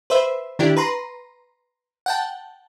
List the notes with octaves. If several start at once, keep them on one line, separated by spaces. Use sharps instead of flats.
B4 C5 E5
D#3 D4 E4 G4
B4 A#5 C6
F#5 G5 A5